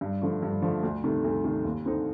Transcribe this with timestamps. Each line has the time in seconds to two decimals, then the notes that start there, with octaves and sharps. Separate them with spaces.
0.01 G2
0.22 D3 F3 A3
0.43 G2
0.62 D3 F3 A3
0.83 D2
1.04 C3 D#3 A3
1.24 D2
1.44 C3 D#3 A3
1.64 D#2
1.85 D3 A3 C4 D#4